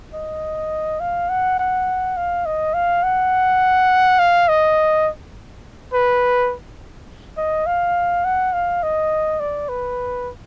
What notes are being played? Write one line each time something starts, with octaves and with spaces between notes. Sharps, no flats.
D#5
F5
F#5
F#5
F5
D#5
F5
F#5
F5
D#5
B4
D#5
F5
F#5
F5
D#5
D5
B4